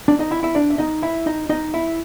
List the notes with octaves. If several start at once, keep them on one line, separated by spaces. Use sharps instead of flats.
D4 D5
D#4 D#5
E4 E5
E4 E5
D4 D5
E5
D#4 D#5
E4 E5
D#4 D#5
D#4 D#5
E4 E5